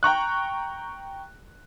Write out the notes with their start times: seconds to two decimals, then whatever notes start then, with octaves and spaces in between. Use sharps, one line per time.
0.03 G5 A#5 C#6 F#6